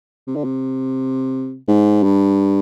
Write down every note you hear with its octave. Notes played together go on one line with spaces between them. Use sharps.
C3
D3
C3
G#2
G2